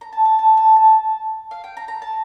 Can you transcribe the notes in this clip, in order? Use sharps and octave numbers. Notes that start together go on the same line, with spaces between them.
A#5
A5
A5
A5
A5
A5
F5
G5
A#5
A#5
A5